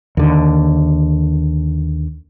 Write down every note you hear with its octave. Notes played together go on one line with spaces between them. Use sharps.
D#2 D3